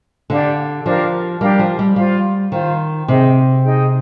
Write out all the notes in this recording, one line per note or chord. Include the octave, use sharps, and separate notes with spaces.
D3 D4 G4 D5 F5
F3 D4 G4 A#4 F5
G3 D4 G4 A#4 F5
F3
G3
G3 F4 C5 F5
D#3 F4 C5 F5
C3 D#4 G#4 D#5 G5
D#4 G#4 D#5 G5